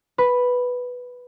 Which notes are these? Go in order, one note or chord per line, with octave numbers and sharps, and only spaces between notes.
B4